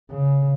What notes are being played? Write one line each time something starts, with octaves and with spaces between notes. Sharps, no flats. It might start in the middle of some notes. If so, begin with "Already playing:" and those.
C#3